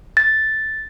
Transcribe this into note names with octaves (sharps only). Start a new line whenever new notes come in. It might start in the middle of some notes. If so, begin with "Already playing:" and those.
A6